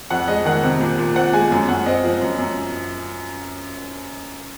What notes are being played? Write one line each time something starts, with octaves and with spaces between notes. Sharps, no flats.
F2 F#5
G#3 D#5
D#3 F#5
C3
A#2
A#2
C4 F#5
G#3 G#5
F#2 G#5
F#2 F#5
C4 D#5
F3
F#2
F#2